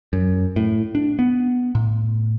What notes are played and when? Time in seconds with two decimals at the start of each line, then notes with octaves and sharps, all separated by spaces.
0.13 F#2
0.56 A2
0.95 D4
1.19 B3
1.75 A2